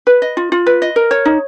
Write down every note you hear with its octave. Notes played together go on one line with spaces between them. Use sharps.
B4
D#5
F4
F4
B4
D#5
A#4
C#5
D#4